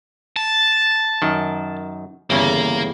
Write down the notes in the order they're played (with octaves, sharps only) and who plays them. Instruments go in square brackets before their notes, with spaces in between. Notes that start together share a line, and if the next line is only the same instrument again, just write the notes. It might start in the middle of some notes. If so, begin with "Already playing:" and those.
[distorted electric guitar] A5
[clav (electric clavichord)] F#2 D#3
[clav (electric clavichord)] G1 E2 C#3 [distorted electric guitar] A#3